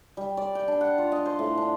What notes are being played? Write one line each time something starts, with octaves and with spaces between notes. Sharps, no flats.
G3
D5
G5
D4
F#5
F4
D#5
C5
A2
D4